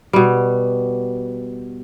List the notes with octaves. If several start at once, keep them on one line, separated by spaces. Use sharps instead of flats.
B2 G3